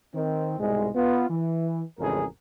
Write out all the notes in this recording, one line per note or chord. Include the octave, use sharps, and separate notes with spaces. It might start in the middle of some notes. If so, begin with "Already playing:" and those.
D#3 C4
C2 G#2 B2 G#3
B3 F4
E3
A1 F2 C#3 G#3 G#4 A#4